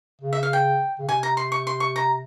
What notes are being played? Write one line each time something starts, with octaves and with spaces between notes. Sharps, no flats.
C#3
E5
F5
G5
C#3
C3 G#5
A#5
C6
C#6
C6
C#6
A#5